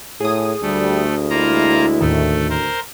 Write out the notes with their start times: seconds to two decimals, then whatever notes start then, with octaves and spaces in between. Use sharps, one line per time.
0.20 A2 G#4 D#6
0.62 D2 G3 A3
1.30 G#3 A#3 E4 F4 A#5
2.01 D#2 A2 D#3 A3
2.50 A#4 C5